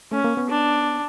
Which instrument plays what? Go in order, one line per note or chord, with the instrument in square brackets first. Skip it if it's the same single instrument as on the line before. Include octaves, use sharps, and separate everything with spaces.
[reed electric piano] A3 [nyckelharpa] C#4
[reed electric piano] A#3
B3
[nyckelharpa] D4